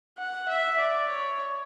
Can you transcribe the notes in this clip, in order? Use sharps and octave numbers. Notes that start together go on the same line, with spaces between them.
F#5
E5
D5
C#5